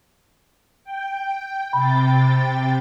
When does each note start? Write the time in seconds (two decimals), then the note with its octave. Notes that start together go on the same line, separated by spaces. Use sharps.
0.84 G5
1.73 C3 G5 B5 A6